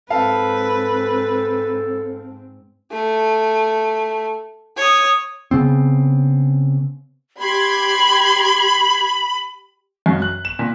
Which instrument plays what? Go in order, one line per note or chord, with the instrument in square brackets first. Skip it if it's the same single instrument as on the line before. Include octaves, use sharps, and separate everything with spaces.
[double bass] G#2 C4 [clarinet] A4 [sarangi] B4 [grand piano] F5 A5
[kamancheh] A3
C#5 D#6
[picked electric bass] C#3 B3 C4
[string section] G4 C6 G#6 [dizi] B5
[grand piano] F#2
F#6
E7
A#2